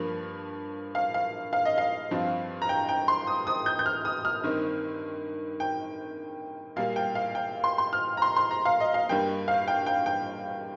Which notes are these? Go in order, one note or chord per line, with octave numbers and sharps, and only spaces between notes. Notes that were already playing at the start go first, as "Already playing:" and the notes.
Already playing: G2 F3 A#3
F5
F5
F5
D#5
F5
G2 F3 C4
A#5
G5
G5
C6
D#6
D#6
G6
G6
F6
D#6
F6
G2 D#3 C4
G5
A#2 G3 A#3 F5
G5
F5
G5
C6
C6
F6
A#5
C6
C6
A#5
F5
D#5
F5
G2 G3 A#3 G5
F5
G5
G5
G5